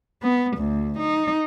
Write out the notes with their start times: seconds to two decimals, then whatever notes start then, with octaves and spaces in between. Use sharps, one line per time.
0.22 B3
0.57 D2
0.99 D#4